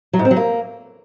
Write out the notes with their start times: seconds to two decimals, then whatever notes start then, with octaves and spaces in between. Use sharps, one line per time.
0.13 F#3
0.19 G#2
0.25 C4
0.31 F#3
0.36 A#3